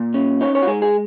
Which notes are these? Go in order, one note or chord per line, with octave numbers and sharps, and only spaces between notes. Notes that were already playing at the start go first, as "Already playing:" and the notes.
Already playing: A#2
C#4
D#4 C#5
C#5
F#4
G#3 G#4
G#4